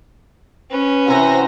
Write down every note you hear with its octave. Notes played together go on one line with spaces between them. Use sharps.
C#4 B4
C3 E3 F#4 C5 A#6